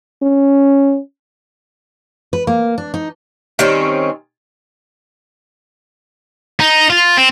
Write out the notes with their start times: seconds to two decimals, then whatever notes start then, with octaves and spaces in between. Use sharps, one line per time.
0.23 C#4
2.33 B4
2.47 A#3
2.78 D4
2.94 D#4
3.59 D#3 G3 C4 C#4
6.60 D#4
6.90 F4
7.17 C4